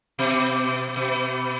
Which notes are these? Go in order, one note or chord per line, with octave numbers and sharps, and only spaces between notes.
B2
B2